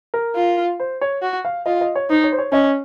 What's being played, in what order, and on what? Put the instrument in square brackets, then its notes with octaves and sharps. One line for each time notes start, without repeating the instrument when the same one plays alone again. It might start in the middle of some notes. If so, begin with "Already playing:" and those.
[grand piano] A#4
[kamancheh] F4
[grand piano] C5
C#5
[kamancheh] F#4
[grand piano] F5
[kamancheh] F4 [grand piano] D#5
[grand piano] D#5
C#5
[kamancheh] D#4 [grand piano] C5
[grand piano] C#5
C5
C#5
[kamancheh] C#4 [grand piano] D#5